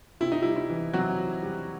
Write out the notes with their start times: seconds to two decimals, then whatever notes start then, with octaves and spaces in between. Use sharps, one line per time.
0.21 C3 E4
0.32 D#4
0.42 G3 E4
0.56 E4
0.70 E3
0.93 C3 F#3 F#4
1.18 C3
1.42 G3